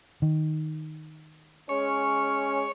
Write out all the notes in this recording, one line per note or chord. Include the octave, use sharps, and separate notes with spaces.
D#3
G#3 C#4 C#5